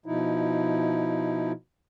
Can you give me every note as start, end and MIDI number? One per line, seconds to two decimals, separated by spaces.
0.06 1.52 47
0.06 1.52 53
0.06 1.52 63
0.06 1.52 64